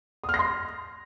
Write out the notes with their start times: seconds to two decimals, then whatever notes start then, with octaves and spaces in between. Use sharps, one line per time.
0.24 D#6
0.29 F6
0.34 A#6
0.39 C6